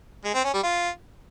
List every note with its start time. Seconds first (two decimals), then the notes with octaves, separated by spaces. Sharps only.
0.24 G#3
0.34 C4
0.44 C#4
0.54 G3
0.63 F4